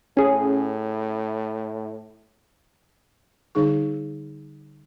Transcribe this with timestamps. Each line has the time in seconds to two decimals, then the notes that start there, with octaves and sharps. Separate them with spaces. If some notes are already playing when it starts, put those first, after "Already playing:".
0.17 A2 C#4 G#4
3.55 D3 G3 D#4 G#4 C#6